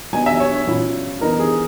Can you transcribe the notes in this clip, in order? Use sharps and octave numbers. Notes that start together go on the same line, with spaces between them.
F#3 B3 D#4 G#5
E5
C#5
C#5
A#2 F#3 C#4 E4
E3 B3 D#4 A#4
G#4